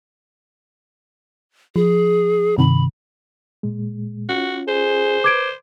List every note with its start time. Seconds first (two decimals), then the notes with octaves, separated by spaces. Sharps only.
1.76 F3 G#4
2.58 G2 C3 D#3 B5
3.63 A#2 G#3
4.29 C#4 F4 F#4
4.68 G#4 C5
5.24 B4 D6 G#6 D7